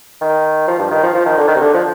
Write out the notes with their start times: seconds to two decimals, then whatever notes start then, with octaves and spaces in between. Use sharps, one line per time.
0.21 D#3
0.68 F3
0.79 G2
0.91 D#3
1.03 F3
1.14 F3
1.26 D#3
1.37 D3
1.48 D#3
1.56 C3
1.61 D3
1.74 F3